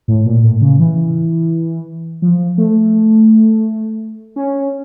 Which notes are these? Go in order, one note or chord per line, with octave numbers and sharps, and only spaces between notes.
A2
A#2
A2
C#3
E3
F3
A3
C#4